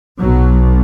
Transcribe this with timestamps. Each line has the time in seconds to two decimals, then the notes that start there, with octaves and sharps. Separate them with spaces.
0.20 B1 B2 F#3